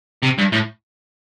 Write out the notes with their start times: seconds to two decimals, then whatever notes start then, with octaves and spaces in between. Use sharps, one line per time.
0.23 C3
0.38 G2
0.52 A2